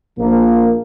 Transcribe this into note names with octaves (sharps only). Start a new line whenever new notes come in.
A#1 A#2 F3 A#3